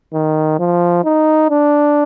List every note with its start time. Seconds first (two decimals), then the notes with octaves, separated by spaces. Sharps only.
0.13 D#3
0.59 F3
1.04 D#4
1.50 D4